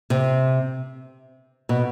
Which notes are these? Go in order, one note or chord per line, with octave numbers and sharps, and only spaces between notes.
C3
B2